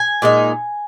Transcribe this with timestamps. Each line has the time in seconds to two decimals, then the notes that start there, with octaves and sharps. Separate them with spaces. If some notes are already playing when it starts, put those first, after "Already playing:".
Already playing: G#5
0.22 A#2 G#3 D#4